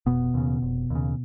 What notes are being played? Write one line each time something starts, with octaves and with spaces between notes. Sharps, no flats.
F1 B2 B3
D#2 C#3
F1
D#2 C#3